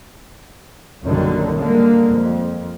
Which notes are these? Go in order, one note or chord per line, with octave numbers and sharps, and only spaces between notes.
A#1 F#2 D3 D#3 F#3 G3
D3 G3 G#3 A#3
F2